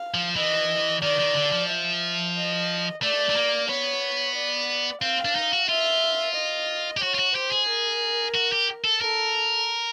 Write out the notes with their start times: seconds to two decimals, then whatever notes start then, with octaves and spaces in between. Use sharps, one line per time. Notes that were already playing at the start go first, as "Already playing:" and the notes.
Already playing: F5
0.14 F3
0.36 E3 D#5
1.03 D#3 D5
1.19 D#3
1.36 D3
1.52 F3
1.69 E5
2.36 D#5
3.03 A3 D5
3.30 A3
3.36 A#3
3.69 B3 C#5
4.35 D5
5.02 C4 F5
5.25 D4
5.36 D#4
5.52 F#4
5.69 F4 E5
6.35 D#5
6.97 G4
7.02 F#4 C#5
7.15 F4
7.19 F#4
7.35 G4 C5
7.51 G#4
7.69 A#4
8.35 F#4
8.52 G4
8.85 A4
9.01 A4 A#4